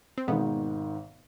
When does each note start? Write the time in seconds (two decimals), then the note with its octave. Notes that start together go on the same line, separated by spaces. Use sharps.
0.18 C4
0.28 G#1 G#2 B2 D#3 B3